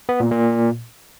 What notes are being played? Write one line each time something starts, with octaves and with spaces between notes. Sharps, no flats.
B3
A#2
A#2